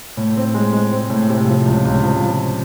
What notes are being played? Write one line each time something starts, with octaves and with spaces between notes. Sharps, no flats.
A2
C4
G#3
G#3
C4
A2
C3
F3
C#2
C#2
F3
F3